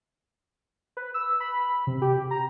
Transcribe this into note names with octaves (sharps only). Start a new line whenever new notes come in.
B4
E6
B5
C3
G4
A#5